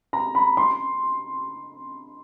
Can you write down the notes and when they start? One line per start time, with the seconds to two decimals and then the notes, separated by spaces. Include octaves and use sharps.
0.13 A#5
0.35 B5
0.57 C6